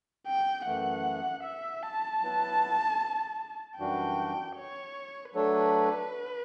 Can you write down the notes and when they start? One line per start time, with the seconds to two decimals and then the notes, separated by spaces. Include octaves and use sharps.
0.27 G5
0.66 F#2 E3 A3 F#5
1.44 E5
1.83 A5
2.22 F#3 B3 E4 B4
3.79 F#2 E3 G3 D4 F#4 G5
4.56 C#5
5.34 F#3 A3 D4 A4 B4 C#5